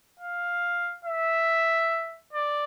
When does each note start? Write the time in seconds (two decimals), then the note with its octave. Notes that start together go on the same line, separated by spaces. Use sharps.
0.19 F5
1.05 E5
2.33 D5